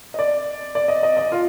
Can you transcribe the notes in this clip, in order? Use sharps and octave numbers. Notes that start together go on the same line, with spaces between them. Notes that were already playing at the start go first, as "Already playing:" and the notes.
D#5
D5
D5
D#5
D#5
D#5
F4